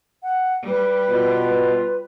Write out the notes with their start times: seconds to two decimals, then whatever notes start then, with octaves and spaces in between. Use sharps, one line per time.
0.23 F#5
0.67 G3 B4
1.10 B2 F4